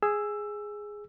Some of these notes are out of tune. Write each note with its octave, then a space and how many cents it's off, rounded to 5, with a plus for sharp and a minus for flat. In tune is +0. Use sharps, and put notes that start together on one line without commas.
G#4 +0 E6 +10